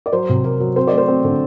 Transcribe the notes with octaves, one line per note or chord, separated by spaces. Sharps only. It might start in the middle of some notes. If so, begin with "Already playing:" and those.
D5
F#3 C5
C3
F#3 A#4
F#3
C4 C5
D5
A3
C5
C4
D3